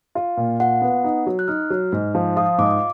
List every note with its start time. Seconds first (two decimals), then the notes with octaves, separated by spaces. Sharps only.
0.15 F4
0.37 A#2
0.60 F4 F#5
0.82 B3
1.04 D#4
1.27 F#3
1.39 F#6
1.48 D#4 F6
1.70 F#3
1.92 G#2
2.15 F3
2.36 F4 D#6
2.58 G#2 D6